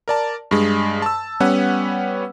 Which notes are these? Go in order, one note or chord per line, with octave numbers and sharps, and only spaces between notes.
A#4 D5 A5
G2 G#3
A5 E6
G3 B3 C#4 B4 F#5